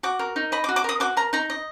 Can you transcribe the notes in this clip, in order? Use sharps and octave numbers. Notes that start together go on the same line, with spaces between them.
F#4 D6
A#4
D#4
D#5 B5
D6
F#4
D6
A#4 D#6
F#4 D6
A#4 A#5
D#4 A#5
D#5